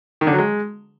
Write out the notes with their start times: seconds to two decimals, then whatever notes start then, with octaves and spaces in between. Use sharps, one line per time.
0.21 D#3
0.27 D3
0.33 F#3
0.38 G#3